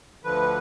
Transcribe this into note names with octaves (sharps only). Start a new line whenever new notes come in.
D2 D3 F3 B4